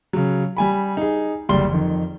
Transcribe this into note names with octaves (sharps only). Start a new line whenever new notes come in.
C#3 F#3
G3 G#5 B5
D#4 G#4
F#1 D2 G3 D5 C6 G7
F2 D#3